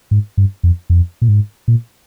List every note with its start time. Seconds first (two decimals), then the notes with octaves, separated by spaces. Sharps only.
0.11 G#2
0.37 G2
0.63 F2
0.90 F2
1.22 A#2
1.28 G#2
1.68 A#2